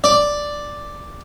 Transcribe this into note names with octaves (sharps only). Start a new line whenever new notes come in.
D5